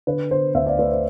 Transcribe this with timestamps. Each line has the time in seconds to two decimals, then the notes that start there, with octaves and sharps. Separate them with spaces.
0.07 D3 B4
0.31 D3 C5
0.54 D2 C5 E5
0.66 D5 F5
0.79 A3 B4 D5
0.92 C5